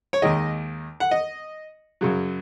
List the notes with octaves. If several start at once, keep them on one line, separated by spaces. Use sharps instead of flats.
C#5
D#2 D#3 G#3 D#5
F#5
D#5
F#2 C#3 F#3